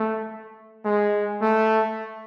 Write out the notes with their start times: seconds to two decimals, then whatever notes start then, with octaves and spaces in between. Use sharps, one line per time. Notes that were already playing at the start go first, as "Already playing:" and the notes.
Already playing: A3
0.85 G#3
1.42 A3